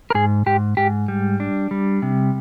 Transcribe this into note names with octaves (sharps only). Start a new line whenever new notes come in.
A#4
G#2 G#4
G#2 G4
G#2 G4
G3
D4
G3
C3